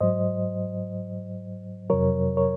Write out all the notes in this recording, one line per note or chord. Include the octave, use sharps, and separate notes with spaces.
G#2 F#3 C5 D#5
F2 C3 F#3 A#4 C#5
A#4 C#5